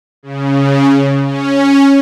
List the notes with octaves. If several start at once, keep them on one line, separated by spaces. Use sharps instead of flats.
C#3
C#4